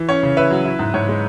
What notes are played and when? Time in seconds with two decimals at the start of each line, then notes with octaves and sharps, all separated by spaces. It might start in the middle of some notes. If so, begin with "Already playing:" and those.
Already playing: E3
0.09 C#4 C#5
0.23 C#3
0.37 E4 B4 E5
0.50 F#3
0.65 E4
0.79 G#2
0.94 G#2 C#5
1.09 G#3